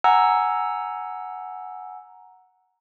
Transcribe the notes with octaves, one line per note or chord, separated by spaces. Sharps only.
F#5 G#5 A#5 E6